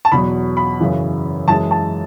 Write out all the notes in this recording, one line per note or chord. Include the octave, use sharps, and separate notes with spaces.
A5
E2 B2 F#3 B5
B5
F#2 C#3 E3
F#2 E3 G#3 A5
A5